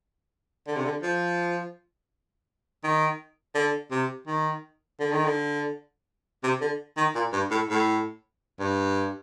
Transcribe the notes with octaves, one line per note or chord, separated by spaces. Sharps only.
D3
C3
D3
F3
D#3
D3
C3
D#3
D3
D#3
D3
C3
D3
D#3
A#2
G2
A2
A2
G2